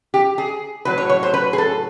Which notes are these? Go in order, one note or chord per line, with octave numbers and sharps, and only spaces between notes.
G4
G#4
A2 F#3 B4
C#5
C#5
C5
B4
G#4
A4